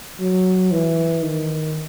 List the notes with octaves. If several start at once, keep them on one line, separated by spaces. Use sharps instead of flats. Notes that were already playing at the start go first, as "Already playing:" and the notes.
F#3
E3
D#3